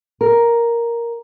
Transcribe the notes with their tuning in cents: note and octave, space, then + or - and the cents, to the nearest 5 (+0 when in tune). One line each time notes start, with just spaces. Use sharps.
A#4 +5